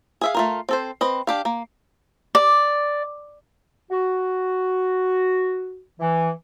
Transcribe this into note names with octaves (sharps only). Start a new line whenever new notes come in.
G#4 E5 F5
A3 F4 A#4
C4 A4 C5
C4 B4 D#5
D4 G4 F5
A#3
D5
F#4
E3